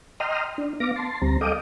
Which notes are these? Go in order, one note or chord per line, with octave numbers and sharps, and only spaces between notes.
D#5 G5 A#5 C6 D#6 F6
D4
B3 F5 D6 A#6
A5 C6
D2 G3 C4 A#5
A4 D#5 F5 G5 D6 D#6